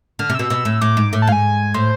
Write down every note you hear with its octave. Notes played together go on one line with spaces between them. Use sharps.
D3 F6
C3
B2 E6
B2
A2
A2 D6
G#2
A2
A5
G#2 F5 G#5
A2 C5